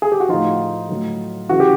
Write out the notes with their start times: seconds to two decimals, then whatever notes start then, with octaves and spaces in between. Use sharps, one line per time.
0.02 G#4
0.12 G4
0.20 F#4
0.29 A2 F3 D#4 F4
0.89 A2 F#3
1.49 C#3 E3 F#4
1.60 G4